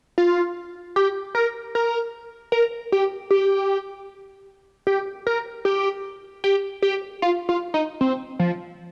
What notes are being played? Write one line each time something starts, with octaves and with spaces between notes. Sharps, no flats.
F4
G4
A#4
A#4
A#4
G4
G4
G4
A#4
G4
G4
G4
F4
F4
D#4
C4
F3